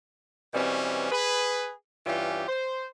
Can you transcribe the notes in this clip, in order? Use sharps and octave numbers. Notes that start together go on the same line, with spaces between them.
B2 E3 G3 C4 C#4
G#4 B4
G2 E3 C#4 F4 G4
C5